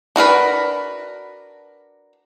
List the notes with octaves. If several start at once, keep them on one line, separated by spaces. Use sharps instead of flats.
D4 F#4 A#4 B4